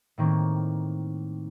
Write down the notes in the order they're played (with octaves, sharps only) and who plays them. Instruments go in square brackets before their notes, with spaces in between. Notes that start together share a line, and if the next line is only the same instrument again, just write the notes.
[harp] A2 D#3 A#3 C4